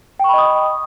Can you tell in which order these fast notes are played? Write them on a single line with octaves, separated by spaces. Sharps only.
G5 C#6 B5 D#5 D#6